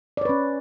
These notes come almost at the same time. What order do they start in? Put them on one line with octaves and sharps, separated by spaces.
D5 C#5 B4 C#4